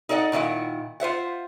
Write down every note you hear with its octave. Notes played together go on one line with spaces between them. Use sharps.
D#4 A4 D5 D#5 F#5
A#2 D#3 F#3 E4 F#5
F4 C5 E5 F#5